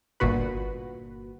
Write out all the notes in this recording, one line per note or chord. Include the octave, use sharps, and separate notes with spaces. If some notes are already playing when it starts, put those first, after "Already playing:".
G1 A#2 F#4 B4